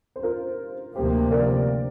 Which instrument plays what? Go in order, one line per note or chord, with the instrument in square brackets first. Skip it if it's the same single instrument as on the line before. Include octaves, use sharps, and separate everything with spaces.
[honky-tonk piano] C5
F4 A#4
[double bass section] D2 C3 F3 A#3 [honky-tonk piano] G4 C5
[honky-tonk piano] A#4 D5